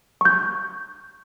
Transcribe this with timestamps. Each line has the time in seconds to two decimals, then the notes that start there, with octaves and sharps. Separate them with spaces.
0.21 C#6 G6